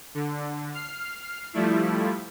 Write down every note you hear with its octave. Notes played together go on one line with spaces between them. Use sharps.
D3
F6 C7
F3 G3 A3 E4